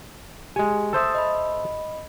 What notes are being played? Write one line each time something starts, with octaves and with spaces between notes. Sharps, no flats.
G#3 G4 G#5
A4 C5 E5 D#6 A6
D#5 B5